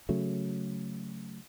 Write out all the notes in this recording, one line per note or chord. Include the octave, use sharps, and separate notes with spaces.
C#3 F#3 A3